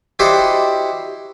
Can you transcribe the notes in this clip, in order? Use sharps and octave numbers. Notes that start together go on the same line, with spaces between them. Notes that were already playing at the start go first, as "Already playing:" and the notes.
E4 F#4 G4 C5 D5 D#5